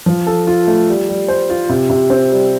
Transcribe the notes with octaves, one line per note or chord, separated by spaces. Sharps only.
F3
A4
F4
A3
G3
G3
C5
F4
C3
C3
C4
G3